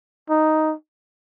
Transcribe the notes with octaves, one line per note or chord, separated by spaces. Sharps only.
D#4